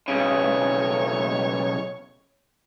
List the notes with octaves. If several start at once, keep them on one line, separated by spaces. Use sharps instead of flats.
B1 C#3 C#5